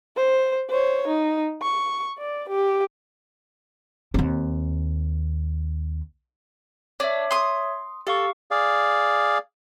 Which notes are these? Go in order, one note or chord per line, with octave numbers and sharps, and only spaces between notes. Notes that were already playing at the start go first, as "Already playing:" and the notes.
C5
C5 C#5
D#4
C#6
D5
G4
D#2 C4
D4 C#5 E5
C6 D#6
G4 A4 F5 C#6
G#4 D5 F5